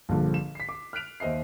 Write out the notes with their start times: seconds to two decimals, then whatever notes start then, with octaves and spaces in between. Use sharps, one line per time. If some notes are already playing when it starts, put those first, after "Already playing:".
0.09 A#1 G2 D3 F3
0.34 E7
0.55 B6 C7
0.69 D6
0.93 F6 F#6 B6 D7 F7
1.20 D#2 C5 D#5 E5 C7